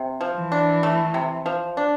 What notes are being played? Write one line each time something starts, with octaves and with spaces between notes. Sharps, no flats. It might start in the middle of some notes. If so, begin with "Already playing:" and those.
Already playing: C3
F3
E3
D4
A3
C3
F3
D4